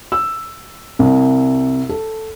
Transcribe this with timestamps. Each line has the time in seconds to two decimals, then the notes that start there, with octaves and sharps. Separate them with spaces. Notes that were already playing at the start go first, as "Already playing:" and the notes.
0.12 E6
0.99 C2
1.89 A4